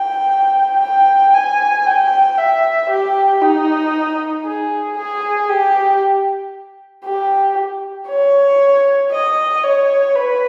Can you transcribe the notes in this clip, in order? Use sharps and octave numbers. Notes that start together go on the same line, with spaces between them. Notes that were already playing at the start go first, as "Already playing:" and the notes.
Already playing: G5
G5
G#5
G5
E5
G4
D#4
G#4
G#4
G4
G4
C#5
D#5
C#5
B4